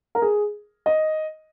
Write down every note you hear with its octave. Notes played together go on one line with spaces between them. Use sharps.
A#4
G#4
D#5